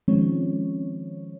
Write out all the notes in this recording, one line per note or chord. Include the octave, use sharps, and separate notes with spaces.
D#3 F3 G#3 C4 C#4 C#5